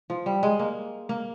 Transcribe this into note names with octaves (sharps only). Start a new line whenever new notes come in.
F3
G3
G#3
A#3
A#3